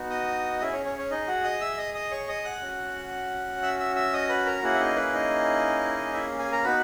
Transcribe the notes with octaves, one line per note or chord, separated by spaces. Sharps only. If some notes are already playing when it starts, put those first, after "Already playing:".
Already playing: B3 D#4 F#4
D#5 D#6
C#4 E4 G#4 E5
C#4 C#5
C#4 C#5
C#4 C#5
D#4 D#5
F#4 F#5
D#5 D#6
E5 E6
D#5 D#6
D#5 D#6
C#5 C#6
D#5 D#6
F#5 F#6
C#4 F#4
E5 E6
E5 E6
E5 E6
D#5 D#6
B4 B5
A#4 A#5
A#3 C#4 E4 F#4 G#4 F#5
E5
D#4 D#5
B4
D#4 D#5
E4 E5
G#4 G#5
A#4 A#5
B3 D#4 F#4 B4 B5